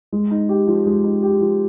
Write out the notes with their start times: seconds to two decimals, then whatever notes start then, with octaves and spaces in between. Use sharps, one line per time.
0.12 G#3
0.31 D#4
0.49 G4
0.67 F3
0.86 G#3
1.04 D#4
1.23 G4
1.41 F3